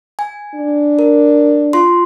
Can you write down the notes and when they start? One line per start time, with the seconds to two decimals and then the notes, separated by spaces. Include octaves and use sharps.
0.19 G#5
0.55 D4
0.99 A#4
1.73 F4 C6